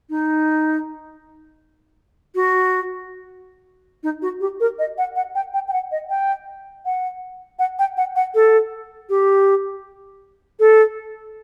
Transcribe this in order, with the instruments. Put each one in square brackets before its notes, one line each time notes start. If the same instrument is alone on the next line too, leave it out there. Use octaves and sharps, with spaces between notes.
[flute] D#4
F#4
D#4
F#4
G4
A#4
D#5
F#5
F#5
G5
G5
G5
F#5
D#5
G5
F#5
F#5
G5
F#5
F#5
A4
G4
A4